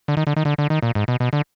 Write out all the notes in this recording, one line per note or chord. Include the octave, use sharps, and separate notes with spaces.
D3
D#3
D3
D#3
D3
D3
D#3
A#2
G#2
B2
B2
D3